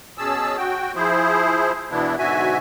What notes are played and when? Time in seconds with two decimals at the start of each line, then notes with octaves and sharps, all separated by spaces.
0.18 B2 C#4 G#4 A5 E6
0.57 F#4 G5
0.96 F3 E4 G#4 C5
1.91 E2 B2 E3 B3 D4 E4
2.19 G#2 B2 D3 F#4 E5 G#5